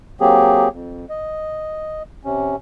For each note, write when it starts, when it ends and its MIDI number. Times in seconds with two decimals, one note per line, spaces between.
0.21 0.69 54
0.21 0.69 58
0.21 0.69 60
0.21 0.69 67
0.21 0.69 68
0.73 1.05 41
1.09 2.03 75
2.25 2.56 48
2.25 2.56 61